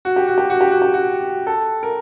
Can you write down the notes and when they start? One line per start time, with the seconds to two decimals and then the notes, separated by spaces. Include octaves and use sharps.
0.05 F#4
0.16 G4
0.28 F#4
0.38 G4
0.50 F#4
0.61 G4
0.72 F#4
0.82 G4
0.94 F#4
1.47 A4
1.83 A#4